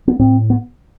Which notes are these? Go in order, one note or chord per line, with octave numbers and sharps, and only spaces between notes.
B3
A2 C4
B3